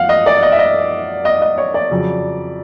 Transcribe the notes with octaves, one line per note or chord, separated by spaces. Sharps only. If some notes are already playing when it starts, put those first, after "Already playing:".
Already playing: F#2 F3 F5 F#5
D#5
D5
D#5
E5
D#5
D#5
D#5
C#5
D5
F2 C#3 F#3